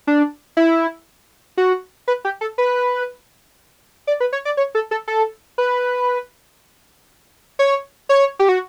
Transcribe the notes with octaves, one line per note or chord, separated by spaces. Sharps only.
D4
E4
F#4
B4
G4
A4
B4
D5
B4
C#5
D5
C#5
A4
A4
A4
B4
C#5
C#5
G4
F#4